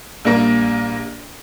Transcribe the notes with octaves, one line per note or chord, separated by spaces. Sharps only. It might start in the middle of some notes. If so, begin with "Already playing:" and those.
A#1 G3 A#3